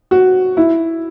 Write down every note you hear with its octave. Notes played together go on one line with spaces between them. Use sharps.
F#4
E4